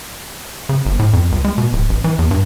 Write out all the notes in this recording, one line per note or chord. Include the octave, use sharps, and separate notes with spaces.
C#3
G1
A2
F2
C#2
G#3
B2
D1
A1
E3
E2
G2